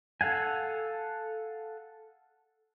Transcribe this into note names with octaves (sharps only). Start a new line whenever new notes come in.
A4 F5 F#5 G#5